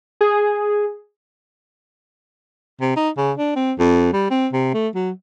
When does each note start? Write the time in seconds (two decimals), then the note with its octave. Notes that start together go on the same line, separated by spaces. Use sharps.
0.21 G#4
2.81 C3
2.96 D#4
3.17 C#3
3.38 D4
3.56 C4
3.79 F2
4.13 G3
4.31 C4
4.53 C3
4.74 A3
4.95 F#3